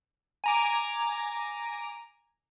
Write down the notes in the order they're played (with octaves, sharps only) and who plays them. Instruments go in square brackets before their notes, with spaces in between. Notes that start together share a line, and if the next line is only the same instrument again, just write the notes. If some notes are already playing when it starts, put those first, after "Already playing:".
[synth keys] G#5 A#5 D6